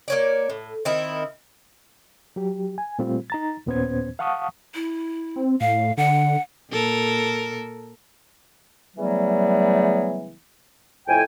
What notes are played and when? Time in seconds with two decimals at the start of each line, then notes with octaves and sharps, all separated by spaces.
0.08 A#3 C#5 D5
0.50 A2
0.85 D#3 C4 E4
2.36 F#3 G4
2.78 G#5
2.99 A#2 G3 A3 C4 F4
3.30 D#4 A#5 A6
3.66 D#2 A#2 B3 C#4 C5 G#6
4.19 F5 F#5 A5 C#6 D#6
4.75 E4
5.36 C4
5.61 A2 F5
5.97 D3 F#5
6.71 A#2 A4 A#4
8.97 C#3 E3 F#3 G3 A3 B3
11.08 F2 A2 G5 G#5